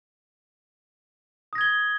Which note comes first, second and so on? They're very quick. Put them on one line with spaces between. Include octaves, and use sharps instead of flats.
D#6 A#6 G#6 G7